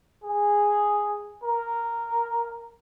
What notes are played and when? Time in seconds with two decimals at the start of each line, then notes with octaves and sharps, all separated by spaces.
0.24 G#4
1.43 A#4